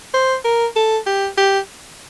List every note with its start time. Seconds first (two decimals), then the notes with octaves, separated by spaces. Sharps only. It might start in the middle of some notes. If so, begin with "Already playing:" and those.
0.14 C5
0.44 A#4
0.76 A4
1.06 G4
1.37 G4